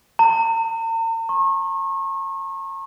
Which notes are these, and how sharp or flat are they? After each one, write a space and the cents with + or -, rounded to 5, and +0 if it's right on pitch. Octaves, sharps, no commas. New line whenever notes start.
A#5 -45
C#6 -35